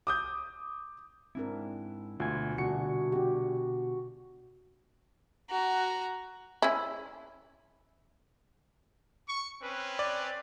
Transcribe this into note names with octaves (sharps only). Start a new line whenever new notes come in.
D6 D#6 G6
G#2 C4 D4 E4 A#4
D2 B2 F4 G#5
C2 D3 D4 F#4 C#7
D4 F#4 G4
F#4 A#5
C#4 E4
C#6
C4 C#4 B4
D5